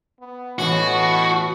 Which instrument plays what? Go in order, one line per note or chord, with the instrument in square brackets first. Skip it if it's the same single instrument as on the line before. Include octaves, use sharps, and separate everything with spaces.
[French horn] B3
[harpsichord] A1 E3 G#5 [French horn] B2 [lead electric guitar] F#4